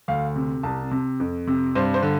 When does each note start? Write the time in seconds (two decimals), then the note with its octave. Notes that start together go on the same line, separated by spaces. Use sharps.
0.08 D2 F5
0.36 C3
0.63 C2 A5
0.91 C3
1.20 F2
1.47 C3
1.75 G2 C5
1.94 C5
2.03 D3